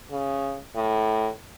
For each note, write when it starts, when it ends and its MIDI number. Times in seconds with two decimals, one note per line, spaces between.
0.11 0.59 49
0.75 1.29 45